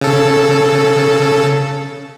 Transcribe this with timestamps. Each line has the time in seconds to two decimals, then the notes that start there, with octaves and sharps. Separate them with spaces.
0.01 C#3 A4